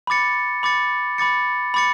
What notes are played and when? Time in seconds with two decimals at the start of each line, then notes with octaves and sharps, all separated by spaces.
0.07 B5 D6 A6 C#7
0.63 B5 D6 A6 C#7
1.18 B5 D6 A6 C#7
1.74 B5 D6 A6 C#7